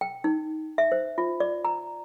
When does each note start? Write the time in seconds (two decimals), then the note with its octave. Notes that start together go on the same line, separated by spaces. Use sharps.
0.01 G5
0.24 D#4
0.78 E5
0.92 C5
1.18 F4
1.40 D5
1.65 A#5